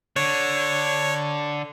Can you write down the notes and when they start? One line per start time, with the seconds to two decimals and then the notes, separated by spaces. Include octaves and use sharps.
0.16 D3 C#5